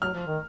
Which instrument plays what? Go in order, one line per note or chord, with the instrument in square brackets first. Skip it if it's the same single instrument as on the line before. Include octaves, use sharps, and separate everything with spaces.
[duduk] F#3 [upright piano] F6
[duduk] F3
D#3